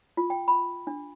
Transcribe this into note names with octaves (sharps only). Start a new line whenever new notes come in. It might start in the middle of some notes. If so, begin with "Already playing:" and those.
F4
G5
B5
D4